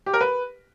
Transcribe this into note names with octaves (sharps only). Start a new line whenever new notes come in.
G4
A#4
B4